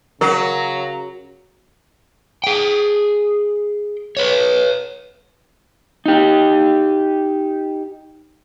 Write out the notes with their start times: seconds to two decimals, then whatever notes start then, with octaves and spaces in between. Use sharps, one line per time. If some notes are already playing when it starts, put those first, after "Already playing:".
0.21 C#3 F#3 A#4 A#5
2.44 G#4 G5
4.17 B4 C#5
6.06 D#4 G4